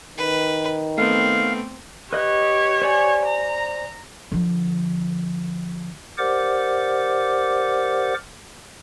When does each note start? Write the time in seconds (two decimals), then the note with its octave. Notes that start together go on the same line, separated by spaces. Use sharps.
0.18 D#3 B4
0.98 A3 B3 C4 F5
2.13 G4 B4 C#5 D#5 F#6
2.82 C5 D5 G#5
3.25 A#5
4.32 D3 F3
6.18 G4 A#4 C5 D5 F#5 D6